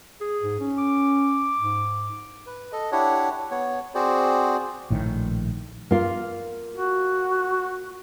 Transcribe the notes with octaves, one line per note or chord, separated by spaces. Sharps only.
G#4
G#2
C#4
D6
G#2
B4
A4 D#5
D4 E4 G4 C#5 F#5
B3 C#5
C4 F#4 G#4 C5 D5
A#1 A2 D#3
A#3 F4
F#4